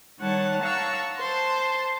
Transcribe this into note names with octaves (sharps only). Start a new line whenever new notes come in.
D#3 G3 C#5 F#5 A5
F5 F#5 A5 A#5 C#6 E6
C5 A5 C6